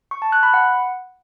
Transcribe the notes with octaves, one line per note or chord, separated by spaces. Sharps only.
C#6
A5
F#6
B5
F#5